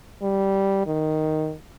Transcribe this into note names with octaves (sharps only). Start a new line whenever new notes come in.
G3
D#3